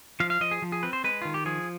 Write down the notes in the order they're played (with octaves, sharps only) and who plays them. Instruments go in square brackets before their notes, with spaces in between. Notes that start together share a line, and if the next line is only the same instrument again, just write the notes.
[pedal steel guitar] F3 F5
F5
F3 D#5
G#4
F3
G#4
C4 B4
C5
G#3 B4
D#3 F4
G4
F3 G#4